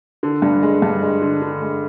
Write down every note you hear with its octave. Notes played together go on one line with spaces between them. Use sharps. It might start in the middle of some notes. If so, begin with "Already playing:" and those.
D3
G2
G#3
G2
G#3
D3
D3
G#3